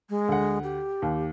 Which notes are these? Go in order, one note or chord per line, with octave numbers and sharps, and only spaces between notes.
G#3
D2 F#5
G4
D#2